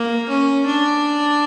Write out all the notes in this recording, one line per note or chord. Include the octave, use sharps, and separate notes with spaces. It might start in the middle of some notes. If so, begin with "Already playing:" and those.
Already playing: A#3
C#4
D4